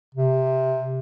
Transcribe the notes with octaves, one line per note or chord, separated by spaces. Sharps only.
C3